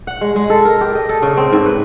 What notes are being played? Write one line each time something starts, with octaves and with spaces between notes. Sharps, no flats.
F#5
G#3
G#3
A4
A#4
G4
D#5
A4
C#3
C4
G#2
B4